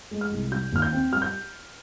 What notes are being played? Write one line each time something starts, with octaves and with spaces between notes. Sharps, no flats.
G#3
F6
C2
G3 G6
D#2 F6
G6
C4
G3 F6
G6